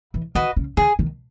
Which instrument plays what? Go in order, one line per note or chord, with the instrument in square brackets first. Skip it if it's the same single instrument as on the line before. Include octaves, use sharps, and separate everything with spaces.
[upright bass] E3
[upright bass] D#3 [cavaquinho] F#4 B4 D#5
[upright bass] C#3
[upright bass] D3 [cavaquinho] G#4
[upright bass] D#3